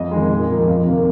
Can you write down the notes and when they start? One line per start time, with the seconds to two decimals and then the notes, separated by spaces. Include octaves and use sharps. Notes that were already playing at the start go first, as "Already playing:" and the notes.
Already playing: F2 D#5
0.11 D#3 G#3
0.30 A#2
0.49 F3 A#3
0.68 F2 F5
0.86 C3 D#3 A#3